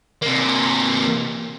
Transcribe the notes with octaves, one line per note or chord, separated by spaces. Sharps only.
C3 A#3